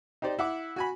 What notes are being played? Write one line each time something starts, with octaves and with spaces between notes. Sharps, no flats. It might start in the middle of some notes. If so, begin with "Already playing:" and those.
D#4 G4 C5 D5
E4 F#5 D6
F#4 G#5 B5